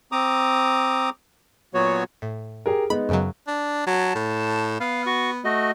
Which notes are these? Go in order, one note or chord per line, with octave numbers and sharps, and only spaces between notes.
C4 A#5 D6 D#6
A#2 F#3 B3 F#4 C#5
A2
G4 G#4 A#4
G#3 B3 D#4 B5
F#2 C#3 F#3
D4
F#3 A5
A2
B3 F5
F#4 C#6
A3 F#4 D#5